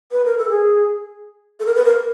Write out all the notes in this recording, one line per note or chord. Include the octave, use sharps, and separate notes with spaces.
B4
A#4
A4
G#4
A4
A#4
B4
A#4